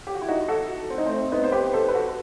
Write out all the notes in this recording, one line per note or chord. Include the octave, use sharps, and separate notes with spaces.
G4
F#4
E4
D#4 F#4
F#4 A4
C4
D#4
A3 C4
B3 D#4
C5
G4 B4
A4 C5
B4
F#4 A4